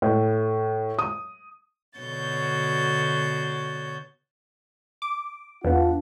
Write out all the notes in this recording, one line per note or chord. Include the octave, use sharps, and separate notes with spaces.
A2
D#6
B2 D3 F#4 C#5 G6 A6
D6
E2 B3 D4 F4 F#5